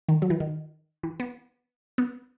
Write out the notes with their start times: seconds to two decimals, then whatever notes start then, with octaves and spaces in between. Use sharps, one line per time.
0.08 D#3
0.22 F#3
0.30 E3
0.40 D#3
1.03 E3
1.20 B3
1.98 B3